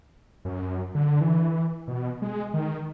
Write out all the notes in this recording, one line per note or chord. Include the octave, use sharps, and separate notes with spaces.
F#2
D3
E3
B2
G#3
D#3